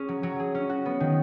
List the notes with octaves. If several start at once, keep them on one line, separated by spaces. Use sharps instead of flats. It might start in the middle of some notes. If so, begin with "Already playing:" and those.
Already playing: C#4 G#4
F#3
F#3
G#4
C#4
F#4
B3
D#3